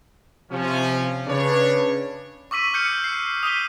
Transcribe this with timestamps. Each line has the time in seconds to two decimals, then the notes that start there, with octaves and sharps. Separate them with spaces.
0.51 C3 F3 C#4
1.27 C#3 D4 B4 C#5
2.51 C#6 D6 E6 B6 D#7
2.74 F6 G6 C#7
3.04 C7
3.43 D#6 B6 D#7 G7